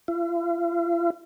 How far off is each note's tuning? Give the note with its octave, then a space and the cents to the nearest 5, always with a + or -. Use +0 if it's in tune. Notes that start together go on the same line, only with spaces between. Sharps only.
F4 -45